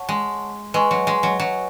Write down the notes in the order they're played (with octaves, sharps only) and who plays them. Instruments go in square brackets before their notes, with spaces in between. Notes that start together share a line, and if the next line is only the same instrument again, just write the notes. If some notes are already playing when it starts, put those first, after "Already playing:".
Already playing: [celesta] C#5 F#5 A5 C#6
[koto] G#3
[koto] G#3 [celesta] B4 D#5 G#5 C#6
[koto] F#3
G#3
F#3
F#3